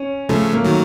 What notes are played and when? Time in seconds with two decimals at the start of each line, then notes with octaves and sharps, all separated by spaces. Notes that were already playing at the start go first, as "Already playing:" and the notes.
Already playing: C#4
0.29 C#3 F3 A3
0.53 A#3
0.64 D#3 F#3